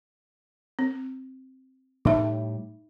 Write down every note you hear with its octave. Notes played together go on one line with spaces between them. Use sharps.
C4
A2 G3 D#4 E5